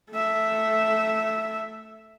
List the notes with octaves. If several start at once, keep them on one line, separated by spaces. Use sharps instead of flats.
A3 E5